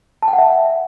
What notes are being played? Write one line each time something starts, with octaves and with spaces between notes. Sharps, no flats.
A5
G5
F#5
E5